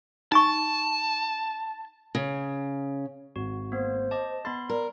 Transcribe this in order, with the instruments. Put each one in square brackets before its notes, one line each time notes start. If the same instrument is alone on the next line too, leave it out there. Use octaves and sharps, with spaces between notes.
[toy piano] D#4 G#5 C#6 [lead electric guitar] A5
[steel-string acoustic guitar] C#3
[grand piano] G#1 [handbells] F#4
[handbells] A#3 B3 [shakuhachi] C5
[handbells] D#5 A5 [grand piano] D6
[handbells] B3 B5 C6 [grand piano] A6
[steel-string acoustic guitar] A#4 [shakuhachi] D5